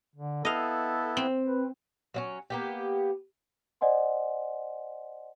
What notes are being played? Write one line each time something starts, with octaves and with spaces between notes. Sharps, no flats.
D3
B3 E4 A4 D#5 F5
C4
B4
F#3 A#3 C#4
A#3 B3 G4
C5 D5 D#5 F#5 G#5 C6